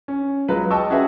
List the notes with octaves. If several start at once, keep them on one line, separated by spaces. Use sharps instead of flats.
C#4
F#3 G#3 F4 B4
D#5 G5 A5 C#6 E6
C#4 F#4 G#4 B4 E5